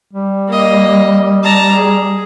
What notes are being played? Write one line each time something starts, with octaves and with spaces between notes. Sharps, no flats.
G3
A#3 D#5
A5 A#5
G#4